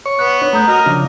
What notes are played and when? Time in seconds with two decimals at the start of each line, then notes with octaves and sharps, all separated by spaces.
0.06 C#5 C#6
0.19 B3 F#6
0.42 D4 C#5
0.53 A3 A#5 D#6 G6
0.68 F#4 A#4 D#5
0.86 C#3 F3 D4